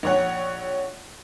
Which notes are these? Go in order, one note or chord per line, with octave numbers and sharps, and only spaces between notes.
A#1 C#5 F#5